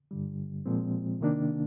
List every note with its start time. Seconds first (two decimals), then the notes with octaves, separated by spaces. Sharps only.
0.11 G2 D3 G3
0.66 A#2 F3 G#3 C4
1.21 C3 D#3 A#3 D4